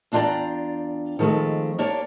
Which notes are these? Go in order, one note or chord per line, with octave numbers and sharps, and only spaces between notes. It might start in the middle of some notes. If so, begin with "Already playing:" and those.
E2 D4 F4 D5 G5 A#5
D#3 F3 G#3 A3 C4
A#3 D4 G4 C#5 D5